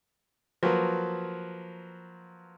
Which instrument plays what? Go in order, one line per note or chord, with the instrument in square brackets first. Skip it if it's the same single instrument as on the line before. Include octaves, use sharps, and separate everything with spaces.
[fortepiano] F3 F#3 A#3 B4